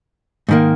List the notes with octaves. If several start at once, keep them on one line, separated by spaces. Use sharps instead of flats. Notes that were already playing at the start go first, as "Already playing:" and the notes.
G#2 D#3 A#3